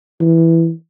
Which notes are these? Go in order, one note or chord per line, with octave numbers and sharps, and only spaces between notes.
E3